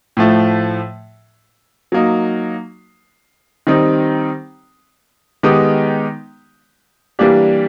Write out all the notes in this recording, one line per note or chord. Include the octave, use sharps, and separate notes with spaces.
A2 F3 A3
F#3 A#3 D#4
D#3 G3 C4 D#4
D#3 G#3 B3 D#4 G4
E3 G3 A#3 D4 G4